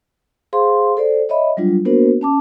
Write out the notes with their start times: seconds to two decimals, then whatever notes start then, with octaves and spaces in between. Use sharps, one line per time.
0.53 G#4 C5 F5 C6
0.97 A4 C5 D5
1.29 C#5 D#5 E5 B5
1.57 F#3 G3 D4 F4
1.85 A#3 B3 D4 F#4 A#4 C5
2.21 C#4 A5 D6